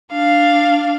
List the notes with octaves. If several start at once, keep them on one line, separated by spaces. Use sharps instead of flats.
D4 F5